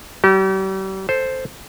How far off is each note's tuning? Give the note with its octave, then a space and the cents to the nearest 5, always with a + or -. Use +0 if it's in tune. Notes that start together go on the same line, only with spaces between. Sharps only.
G3 -40 G4 -40
A4 +0 C5 +0